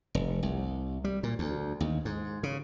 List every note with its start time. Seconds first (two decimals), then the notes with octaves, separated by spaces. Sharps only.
0.15 F1
0.43 C2
1.04 G3
1.23 A#2
1.39 D2
1.80 D#2
2.05 G#2
2.43 C#3